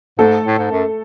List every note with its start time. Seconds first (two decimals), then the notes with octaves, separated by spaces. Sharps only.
0.19 G#2 A3 A4
0.46 A2
0.58 G#2
0.71 F#2